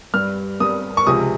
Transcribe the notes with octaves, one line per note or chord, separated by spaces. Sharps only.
G2 G3 F6
G2 G3 D#6
C#6
C#2 C3 F3 G#3 D#6